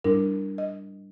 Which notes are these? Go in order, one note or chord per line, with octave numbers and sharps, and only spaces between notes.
G#2 G3 D4 E4 A#4
D#5